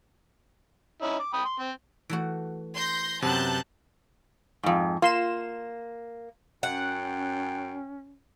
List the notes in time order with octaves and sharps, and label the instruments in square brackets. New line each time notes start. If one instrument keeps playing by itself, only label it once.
[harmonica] C#4 D#4 E4
D6
G5 B5 D#6
C6
C4
[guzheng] E3 A3 F#4
[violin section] C6 G6 A#6
[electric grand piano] F#2 C3 [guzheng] B3 [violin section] A5 F#6 G6
[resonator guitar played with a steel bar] F2 G#2
[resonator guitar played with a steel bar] A#3 [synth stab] F4 C6 E7
[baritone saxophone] F#2 [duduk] C#4 [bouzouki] F#5 [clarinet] G5